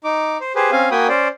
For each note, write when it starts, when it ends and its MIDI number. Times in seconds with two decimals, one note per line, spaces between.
0.04 0.38 63
0.04 0.38 86
0.41 0.53 72
0.55 0.71 67
0.55 0.71 68
0.55 0.71 71
0.55 0.71 72
0.72 0.90 60
0.72 0.90 61
0.72 0.90 77
0.72 0.90 80
0.91 1.08 58
0.91 1.08 66
0.91 1.08 79
0.91 1.08 80
0.91 1.08 83
0.91 1.08 87
1.08 1.28 61
1.08 1.28 72
1.08 1.28 74